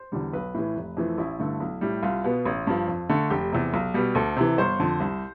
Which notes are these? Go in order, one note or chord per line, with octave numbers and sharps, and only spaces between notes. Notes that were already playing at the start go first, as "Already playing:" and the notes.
Already playing: C5
E2 D3 G3
B1 B4
A2 E3
F1
F2 E3 A3
A1 E4
G2 D3 A3
B1
A2 G3
C2 F4
B2 B3
A1
G2 F3
F2
D3 A3
F1 G4
E2 C3
B1
B2 G3 B3
D2 A4
C3 E3
G1 C5
F2 D3
C2